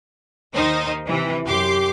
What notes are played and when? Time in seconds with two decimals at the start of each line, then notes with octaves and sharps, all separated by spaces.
0.54 D#2 D#3 D#4 C5
1.07 C3 E3
1.45 F#2 G4 C6 D6 C7